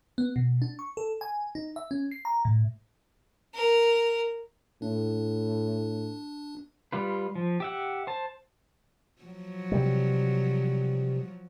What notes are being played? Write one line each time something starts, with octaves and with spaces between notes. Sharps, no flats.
B3
B2
D4
C#6
A4
G#5
D#4
E5
C#4
C7
A#5
A2
A#4
A2 D4
G3 F4 B4
F3
G4 E5 F#5
C5 A5
F3 F#3
C3 G3